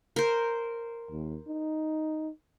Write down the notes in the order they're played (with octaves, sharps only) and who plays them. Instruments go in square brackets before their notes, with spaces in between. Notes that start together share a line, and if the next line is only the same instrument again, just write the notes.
[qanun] A#4 C5
[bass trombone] D#2
D#4